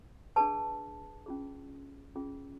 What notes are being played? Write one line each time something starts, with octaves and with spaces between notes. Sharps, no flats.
D4 G#4 B4 A5
C#4 F4 G#4
C#4 F4 G#4